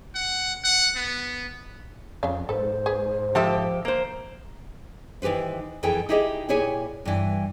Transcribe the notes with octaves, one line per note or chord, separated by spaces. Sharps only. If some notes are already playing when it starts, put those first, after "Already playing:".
F#5
F#5
B3
F2 C#3 C#4 F5
G#2 A4 B4 C5
G#4 B4
F3 F4 G4 A4 E5
A#3 C5
D#3 E3 G4 B4 C5
F2 E3 G#4 A4 G5
D#4 E4 G4 G#4 C#5 D#5
A#2 E4 G4 G#4 C#5 G#5
G2 E3